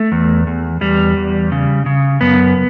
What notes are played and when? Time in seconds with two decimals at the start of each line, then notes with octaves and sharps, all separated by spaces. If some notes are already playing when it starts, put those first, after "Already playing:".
Already playing: A3
0.12 E2
0.47 E2
0.81 E2 G3
1.17 E2
1.52 C#3
1.86 C#3
2.21 F#2 B3